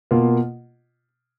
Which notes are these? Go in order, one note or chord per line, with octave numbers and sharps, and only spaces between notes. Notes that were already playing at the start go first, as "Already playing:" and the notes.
B2 A#3 F4